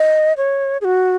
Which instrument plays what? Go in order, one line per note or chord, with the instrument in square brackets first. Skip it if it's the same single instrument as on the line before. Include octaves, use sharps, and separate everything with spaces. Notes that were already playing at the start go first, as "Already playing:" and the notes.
Already playing: [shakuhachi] D#5
C#5
G#4
F#4